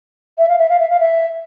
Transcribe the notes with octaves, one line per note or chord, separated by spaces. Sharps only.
E5
F5
E5
F5
E5
F5
E5